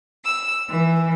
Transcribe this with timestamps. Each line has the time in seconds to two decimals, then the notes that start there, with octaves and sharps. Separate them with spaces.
0.23 E6
0.69 E3